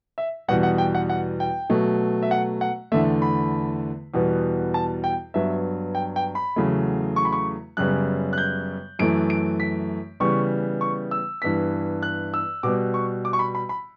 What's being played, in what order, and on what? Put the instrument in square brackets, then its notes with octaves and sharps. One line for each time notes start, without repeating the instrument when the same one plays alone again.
[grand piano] E5
E2 B2 G3 B3 F#5
F#5
G5
F#5
F#5
G5
B2 F#3 A3
E5
F#5
F#5
E2 D3 A3 E5
B5
E2 B2 G3 B3
A5
G5
G2 F#3 B3 E5
G5
G5
B5
E2 C#3 F#3 A3
C#6
B5
C#6
F#2 C#3 G3 B3 F#6
F#6
G6
F#2 E3 A3 D7
D7
B6
C#3 E3 G3 B3 C#6
C#6
E6
G2 E3 B3 B6
F#6
E6
B2 G3 B3 D6
C#6
D6
C#6
B5
B5
B5